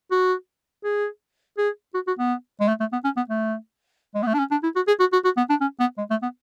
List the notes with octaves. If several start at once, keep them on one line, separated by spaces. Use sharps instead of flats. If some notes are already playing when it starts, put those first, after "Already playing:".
F#4
G#4
G#4
F#4
F#4
B3
G#3
A3
A3
B3
C#4
B3
A3
G#3
B3
A3
D4
C#4
D4
E4
F#4
G#4
F#4
F#4
F#4
B3
D4
C#4
B3
G#3
A3
B3